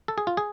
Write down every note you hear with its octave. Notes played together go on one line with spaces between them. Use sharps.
A4
G#4
F4
G#4